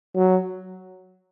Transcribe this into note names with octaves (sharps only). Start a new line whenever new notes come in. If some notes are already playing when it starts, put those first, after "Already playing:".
F#3